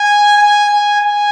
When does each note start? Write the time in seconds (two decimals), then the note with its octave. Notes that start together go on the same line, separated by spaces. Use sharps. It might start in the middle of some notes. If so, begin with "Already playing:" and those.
Already playing: G#5
0.37 G#5
0.69 G#5
1.01 G#5